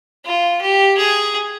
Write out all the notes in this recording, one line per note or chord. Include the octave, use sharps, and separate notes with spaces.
F4
G4
G#4